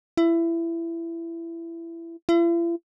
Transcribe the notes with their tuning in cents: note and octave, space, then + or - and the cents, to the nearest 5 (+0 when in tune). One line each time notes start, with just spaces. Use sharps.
E4 +20
E4 +45